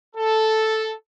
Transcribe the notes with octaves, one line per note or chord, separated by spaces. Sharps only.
A4